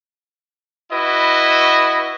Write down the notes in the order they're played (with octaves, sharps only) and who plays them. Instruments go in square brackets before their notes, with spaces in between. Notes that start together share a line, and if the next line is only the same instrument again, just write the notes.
[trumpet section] E4 F#4 B4 D#5